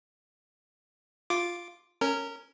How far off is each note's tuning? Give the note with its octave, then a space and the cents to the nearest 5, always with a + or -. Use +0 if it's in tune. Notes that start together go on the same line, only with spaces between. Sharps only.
F4 +0 D6 +0
C#4 +0 A#4 -20